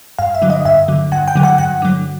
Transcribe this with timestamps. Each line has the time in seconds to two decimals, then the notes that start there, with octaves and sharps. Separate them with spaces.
0.19 G2 F5
0.35 E5
0.42 D3 F#3
0.50 D#5
0.65 G2 E5
0.88 D3 F#3
1.12 G2 F#5
1.28 G5
1.36 D3 F#3
1.43 F#5
1.58 G2 F#5
1.82 D3 F#3